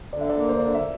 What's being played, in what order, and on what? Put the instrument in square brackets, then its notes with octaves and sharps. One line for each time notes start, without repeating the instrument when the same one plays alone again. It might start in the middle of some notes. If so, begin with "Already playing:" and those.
[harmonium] D3 [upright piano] D5
[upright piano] E5
D5
[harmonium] A#3
[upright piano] C5
[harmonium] D3 [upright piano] D5
[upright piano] E5